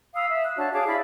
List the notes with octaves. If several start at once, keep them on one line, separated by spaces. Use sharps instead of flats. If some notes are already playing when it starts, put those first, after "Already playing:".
F5 B5 D#6 E6
E5
F#6
D4 F#4 C#5 A5
G#4 C#5 F5 D6
E4 D5 F5 B5